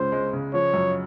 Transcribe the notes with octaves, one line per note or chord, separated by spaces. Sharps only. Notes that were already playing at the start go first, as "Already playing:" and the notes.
Already playing: C#2 C#3 C#4 C5
G#3
C#3
F3 C#5
F#2